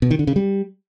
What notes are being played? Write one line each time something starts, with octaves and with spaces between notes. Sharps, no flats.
B2
D#3
D3
C#3
G3